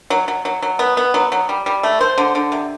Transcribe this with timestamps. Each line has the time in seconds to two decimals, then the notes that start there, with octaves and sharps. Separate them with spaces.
0.10 F#3
0.28 F#3
0.45 F#3
0.62 F#3
0.79 B3
0.97 B3
1.14 F#3
1.32 F#3
1.49 G3
1.66 G3
1.83 A3
2.01 C5
2.18 D3
2.35 D3
2.52 C3